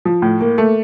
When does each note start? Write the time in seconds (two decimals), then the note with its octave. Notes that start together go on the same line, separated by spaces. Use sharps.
0.05 F3
0.22 A2
0.41 A#3
0.58 A3